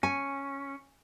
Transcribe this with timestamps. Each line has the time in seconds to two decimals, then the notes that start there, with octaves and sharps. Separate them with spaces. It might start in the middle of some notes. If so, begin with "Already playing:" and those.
0.03 C#4 G#5